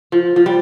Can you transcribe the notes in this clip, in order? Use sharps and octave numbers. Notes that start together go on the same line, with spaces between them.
F3
F3
G3